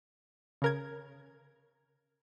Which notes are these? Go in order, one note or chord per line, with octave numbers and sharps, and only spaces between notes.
C#3 A#4 G#6